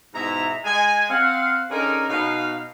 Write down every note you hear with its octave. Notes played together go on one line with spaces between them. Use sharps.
G#2 B2 G#3 E4 E5 A#5
G#3 G#5
C4 F5 F#5
D3 C#4 D#4 G#4 A#4
B2 D#4 F5